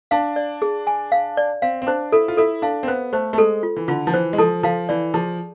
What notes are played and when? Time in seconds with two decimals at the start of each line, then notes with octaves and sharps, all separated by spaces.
0.11 D4 F5
0.36 D5
0.62 G#4
0.87 G#5
1.12 F5
1.37 D5
1.62 C4 F5
1.82 C4
1.87 D4 C5
2.12 E4 A4
2.28 F4
2.37 E4 A4
2.62 D4 F5
2.83 C4
2.87 B3 C5
3.13 A3 C5
3.33 A3
3.38 G#3 A4
3.63 F4
3.76 E3
3.88 D3 F4
4.07 F3
4.14 E3 C5
4.33 G#3
4.38 F3 A4
4.63 F3 F5
4.89 E3 D5
5.14 F3 G#4